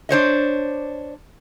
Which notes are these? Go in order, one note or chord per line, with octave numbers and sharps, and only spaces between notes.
D4 C5 C#5 D#5